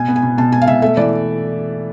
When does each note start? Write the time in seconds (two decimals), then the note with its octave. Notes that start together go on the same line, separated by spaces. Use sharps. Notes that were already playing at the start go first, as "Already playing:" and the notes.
Already playing: B2 G#5
0.08 B3
0.16 G#5
0.23 B2
0.38 B2 A5
0.52 B2 G#5
0.62 F5
0.67 B2 E5
0.82 A3 E5
0.97 E3 D5